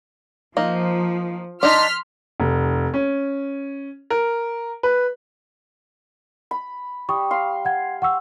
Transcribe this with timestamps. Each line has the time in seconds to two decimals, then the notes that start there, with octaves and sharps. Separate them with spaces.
0.57 F3 A#3 D#4
1.63 D4 D#4 C6 F6 B6
2.40 F1
2.94 C#4
4.10 A#4
4.83 B4
6.51 B5
7.09 G3 C#6 D#6
7.31 F5 C6
7.65 F#5 G#6
8.02 F#5 C#6 E6